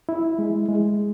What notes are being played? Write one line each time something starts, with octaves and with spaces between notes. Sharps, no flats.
E4
G#3
G#3